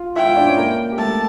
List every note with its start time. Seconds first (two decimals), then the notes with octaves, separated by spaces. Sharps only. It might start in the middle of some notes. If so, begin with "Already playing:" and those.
Already playing: F4 F5
0.16 E4 E5 G5
0.26 F4 F5
0.36 D4 D5
0.46 C#4 C#5
0.57 A#3 A#4
0.92 G4
0.98 A3 A4 A5